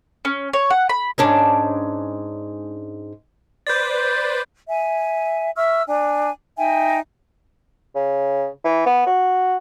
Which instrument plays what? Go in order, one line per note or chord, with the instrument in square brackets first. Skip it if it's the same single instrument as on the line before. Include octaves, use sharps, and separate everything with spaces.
[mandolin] C#4
C#5
F#5
B5
[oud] G#2 C#4 D4
[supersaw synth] B4 C5 D5 [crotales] G6 A6
[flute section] E5 G#5
E5 C#6 E6 F6
D4 G#5
D#4 E5 G5 G#5
[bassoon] C#3
E3
B3
F#4